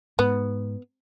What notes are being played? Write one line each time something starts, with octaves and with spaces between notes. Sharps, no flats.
G#2 B3